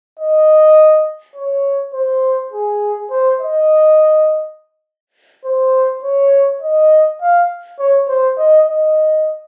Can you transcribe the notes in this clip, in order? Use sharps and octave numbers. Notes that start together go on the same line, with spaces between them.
D#5
C#5
C5
G#4
C5
D#5
C5
C#5
D#5
F5
C#5
C5
D#5
D#5